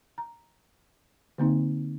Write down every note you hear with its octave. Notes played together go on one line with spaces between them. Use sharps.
A#5
D3 A#3 C4 D#4